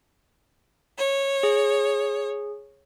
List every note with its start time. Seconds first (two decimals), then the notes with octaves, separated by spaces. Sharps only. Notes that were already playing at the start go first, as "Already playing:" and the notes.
0.99 C#5
1.43 G#4